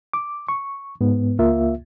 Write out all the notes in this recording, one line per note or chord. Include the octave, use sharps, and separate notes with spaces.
D6
C#6
G#2 B3
C#2 A#3 F4 E5